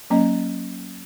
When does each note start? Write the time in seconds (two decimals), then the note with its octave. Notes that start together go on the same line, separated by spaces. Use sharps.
0.10 F#3 A#3 C#4 D#5